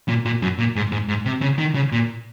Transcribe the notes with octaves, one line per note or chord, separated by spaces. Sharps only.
A#2
A#2
F#2
A#2
G#2
G#2
G#2
C3
C#3
D#3
C#3
A#2